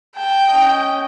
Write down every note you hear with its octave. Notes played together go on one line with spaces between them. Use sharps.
G5 A5
C#4 D#5